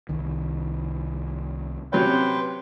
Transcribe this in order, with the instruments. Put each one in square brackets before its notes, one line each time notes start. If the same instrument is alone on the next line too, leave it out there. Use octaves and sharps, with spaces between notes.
[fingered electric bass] C2 D#3
[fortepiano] C3 F#3 C#4 [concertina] B4 C5 G5